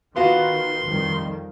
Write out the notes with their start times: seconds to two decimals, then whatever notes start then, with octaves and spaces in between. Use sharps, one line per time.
0.16 D#3 B3 F4 F#4 C6
0.85 F2 D#3 G3